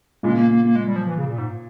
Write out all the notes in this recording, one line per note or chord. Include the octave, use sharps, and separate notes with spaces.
A#2 C#3 G#3
A#3
A#3
A#3
G#3
G3
F3
E3
C#3
A#2
G#2